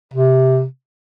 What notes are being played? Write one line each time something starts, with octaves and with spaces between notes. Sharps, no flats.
C3